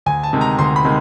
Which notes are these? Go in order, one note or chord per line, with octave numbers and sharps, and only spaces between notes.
D2 G#5
A5
C3 D#3 G#3
A#5
D2 C6
B5
C3 D#3 G#3